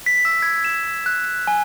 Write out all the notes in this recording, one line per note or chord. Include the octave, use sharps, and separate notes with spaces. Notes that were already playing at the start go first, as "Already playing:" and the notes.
B6
E6
G#6
E7
F#6
G#5